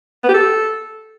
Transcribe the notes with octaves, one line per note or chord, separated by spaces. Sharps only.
B3
G4
A4